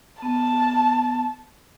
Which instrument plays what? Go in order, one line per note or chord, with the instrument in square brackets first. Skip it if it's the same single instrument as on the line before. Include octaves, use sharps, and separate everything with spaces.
[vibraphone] B3 [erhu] A5